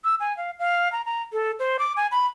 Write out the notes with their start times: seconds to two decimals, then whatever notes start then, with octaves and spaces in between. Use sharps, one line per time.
0.04 E6
0.20 G#5
0.37 F5
0.59 F5
0.92 A#5
1.05 A#5
1.33 A4
1.59 C5
1.79 D6
1.96 G#5
2.11 B5